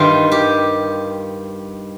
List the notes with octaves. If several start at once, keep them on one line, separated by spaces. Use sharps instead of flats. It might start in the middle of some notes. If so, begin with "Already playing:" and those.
Already playing: G2 D#3 F4
G4